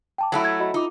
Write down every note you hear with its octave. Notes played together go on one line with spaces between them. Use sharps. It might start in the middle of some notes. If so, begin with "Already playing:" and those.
G5 A5 D6
F#3 A3 E4
G#6
F#4 D#5 B5
D#4 F4 D6